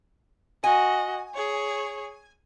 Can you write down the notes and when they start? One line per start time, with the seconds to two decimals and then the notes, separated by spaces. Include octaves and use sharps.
0.64 F#4 D#5 G#5
1.35 G#4 C#5